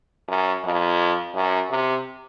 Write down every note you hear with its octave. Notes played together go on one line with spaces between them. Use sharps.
F#2
F2
F#2
C3